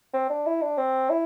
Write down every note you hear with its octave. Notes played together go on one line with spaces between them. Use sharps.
C4
D4
E4
D4
C4
E4